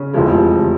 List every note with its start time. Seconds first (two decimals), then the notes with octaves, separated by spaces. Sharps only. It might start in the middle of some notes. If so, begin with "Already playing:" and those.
Already playing: C#3
0.13 F1 E2 C3 F3 G#3